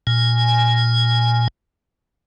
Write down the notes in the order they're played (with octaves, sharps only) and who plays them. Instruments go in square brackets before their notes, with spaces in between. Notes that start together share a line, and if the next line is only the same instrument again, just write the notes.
[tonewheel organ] A#2 G#5